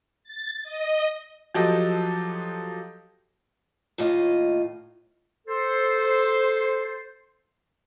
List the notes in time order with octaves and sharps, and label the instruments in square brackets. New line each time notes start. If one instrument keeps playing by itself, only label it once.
[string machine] A6
D#5
[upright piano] F3 F#3 G4 A4 D#5
[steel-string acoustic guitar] D#2 A2 F4 D#5
[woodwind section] A4 C5